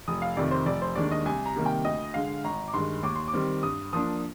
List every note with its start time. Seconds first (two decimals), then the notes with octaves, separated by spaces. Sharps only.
0.08 F1 D#6
0.22 F5
0.37 F2 C3 D#3 D5
0.51 C5
0.66 F1 D5
0.82 C5
0.96 D#2 D#3 G#3 D4 D5
1.12 D#5
1.25 C2 G#5
1.46 A#5
1.56 C3 D#3 G3 A#3
1.66 G5
1.84 D2 D#5
2.14 D3 G#3 F5
2.44 G#1 A#5
2.68 D6
2.74 G2 D#3 G#3 C6
3.03 D#2 D6
3.16 C6
3.28 D6
3.33 D#3 G3 C4
3.63 G2 D#6
3.93 F3 A#3 D4 D#6